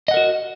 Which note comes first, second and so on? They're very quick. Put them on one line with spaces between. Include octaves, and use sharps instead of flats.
D#5 F#5 A#4 F#4